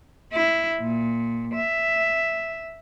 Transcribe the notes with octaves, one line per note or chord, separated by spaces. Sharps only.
E4
A#2
E5